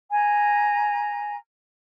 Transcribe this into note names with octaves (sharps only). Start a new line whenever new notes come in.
G#5 A#5